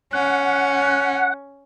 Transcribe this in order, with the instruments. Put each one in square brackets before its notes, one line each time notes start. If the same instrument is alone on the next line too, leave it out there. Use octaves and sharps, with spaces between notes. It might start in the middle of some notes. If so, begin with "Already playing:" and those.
[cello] C#4 [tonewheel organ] F#5